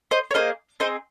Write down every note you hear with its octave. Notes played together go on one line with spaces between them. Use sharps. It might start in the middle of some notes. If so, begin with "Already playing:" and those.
C5 D#5
C#5
A#3 F4 G#4 C5 D#5
C4 D#4 G#4 C5 D#5